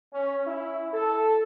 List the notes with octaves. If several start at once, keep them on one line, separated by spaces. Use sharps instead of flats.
C#4
E4
A4